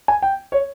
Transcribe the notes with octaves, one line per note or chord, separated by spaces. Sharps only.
G#5
G5
C#5